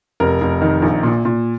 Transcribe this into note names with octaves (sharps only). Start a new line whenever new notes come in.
F1 A#4
F1
D#3
A#1
A#2
A#2